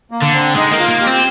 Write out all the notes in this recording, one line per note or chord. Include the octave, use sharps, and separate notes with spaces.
A#3
D3
C4
G#3 D#4
A#3
F4
A#3
G4
C4